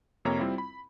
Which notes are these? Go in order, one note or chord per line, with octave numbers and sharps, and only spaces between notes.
F2 C3 A#3 C#5 A#5
G3 C4 E4 F4
B5